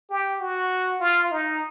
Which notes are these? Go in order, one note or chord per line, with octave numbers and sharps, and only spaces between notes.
G4
F#4
F4
D#4